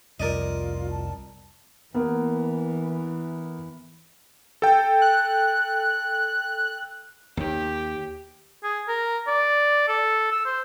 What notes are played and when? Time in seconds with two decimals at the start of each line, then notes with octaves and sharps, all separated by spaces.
0.20 C2 F2 F4 A#4 D5 D#5
0.91 A5
1.94 E3 A#3 B3
4.62 A4 G5
5.01 F#6
7.37 D#2 D#3 G4
8.64 G#4
8.88 A#4
9.27 D5
9.88 A4
10.32 E6
10.46 C5